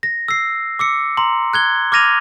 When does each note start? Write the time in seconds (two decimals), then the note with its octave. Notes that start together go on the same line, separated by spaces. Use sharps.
0.03 A#6
0.28 E6 C7
0.79 D6 E6 C#7
1.17 A#5 C6
1.53 F#6 G#6 G7
1.92 D6 F6 G#6 A#6 D#7 F7